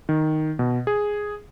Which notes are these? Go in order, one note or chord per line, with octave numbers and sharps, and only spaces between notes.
D#3
B2
G#4